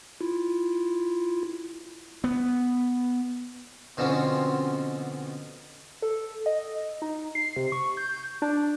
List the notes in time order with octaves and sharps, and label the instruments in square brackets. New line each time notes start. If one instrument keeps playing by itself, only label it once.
[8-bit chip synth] E4 F4
[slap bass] B3
[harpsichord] B2 D3 F3 C4 C#4
[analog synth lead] A4
D#5
D#4
C7
C3
C#6
G6
D4